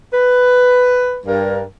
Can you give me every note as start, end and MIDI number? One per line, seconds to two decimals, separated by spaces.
0.13 1.20 71
1.26 1.62 43
1.26 1.62 70